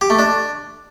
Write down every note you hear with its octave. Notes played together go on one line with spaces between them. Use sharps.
G4
A3
D4